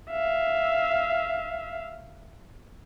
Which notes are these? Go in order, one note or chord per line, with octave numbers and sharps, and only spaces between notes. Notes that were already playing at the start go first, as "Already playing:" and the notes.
E5 F5